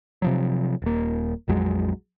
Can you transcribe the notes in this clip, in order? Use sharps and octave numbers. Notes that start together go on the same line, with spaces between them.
C3 F3 F#3
D#1 A#3
A#1 F2 F#3 G#3